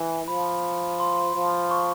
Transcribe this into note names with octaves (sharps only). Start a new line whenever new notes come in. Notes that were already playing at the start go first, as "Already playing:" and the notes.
Already playing: E3
F3 B5
C6
F3
C#6